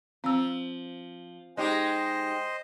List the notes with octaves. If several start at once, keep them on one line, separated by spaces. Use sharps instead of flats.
F3 C4 E6
G#3 D#4 G4 C5 D#5